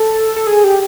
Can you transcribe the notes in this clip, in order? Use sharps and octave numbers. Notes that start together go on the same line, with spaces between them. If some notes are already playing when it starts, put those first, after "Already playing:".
Already playing: A4
A4
G#4
G4